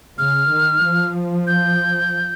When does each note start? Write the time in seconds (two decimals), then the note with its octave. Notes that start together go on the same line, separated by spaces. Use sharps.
0.17 C#3 F6
0.50 D#3
0.83 F3
1.47 G6